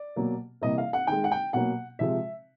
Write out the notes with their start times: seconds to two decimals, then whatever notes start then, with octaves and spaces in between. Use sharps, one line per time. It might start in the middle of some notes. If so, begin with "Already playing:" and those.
Already playing: D5
0.16 B2 F#3 A#3
0.62 C3 E3 G3 A#3 D#5
0.78 F5
0.93 F#5
1.07 D#3 G#3 G5
1.24 F#5
1.32 G5
1.53 B2 F#3 A#3 F#5
1.99 C3 F3 G#3 E5